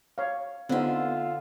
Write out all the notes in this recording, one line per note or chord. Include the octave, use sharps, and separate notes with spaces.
C#5 F5
D3 B3 C4 D#4 F4 E5